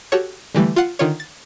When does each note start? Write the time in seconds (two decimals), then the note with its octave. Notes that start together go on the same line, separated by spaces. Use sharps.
0.12 F#4 G4 A4 C#5
0.55 D3 E3 G3 A3
0.76 F4 F#5 C7
0.99 D3 D#3 F4 C#5
1.20 A6